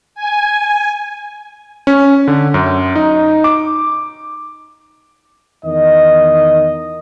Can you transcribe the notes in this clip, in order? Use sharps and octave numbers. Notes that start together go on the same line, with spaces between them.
G#5
C#4
D3
F#2
D#4
D6
E2 D#3 D#5